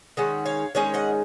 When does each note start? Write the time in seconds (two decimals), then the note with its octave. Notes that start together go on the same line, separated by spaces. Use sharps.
0.17 D#3 G#3 C#4 F#5
0.46 C#5 F5
0.75 D#3 G#3 C#4 C#5 F5
0.94 D#5 F#5